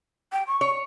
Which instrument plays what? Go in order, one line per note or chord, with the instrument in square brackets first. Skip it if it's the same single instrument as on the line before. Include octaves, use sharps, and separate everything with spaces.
[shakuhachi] G5
C#6
[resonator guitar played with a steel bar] C#5